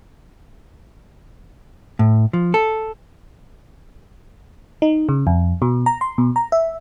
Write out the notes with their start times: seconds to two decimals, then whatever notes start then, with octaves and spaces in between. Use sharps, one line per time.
1.99 A2
2.33 F3
2.54 A4
4.82 D#4
5.09 C#3
5.27 F2
5.62 B2
5.86 A#5
6.01 C6
6.18 B2
6.36 A#5
6.52 E5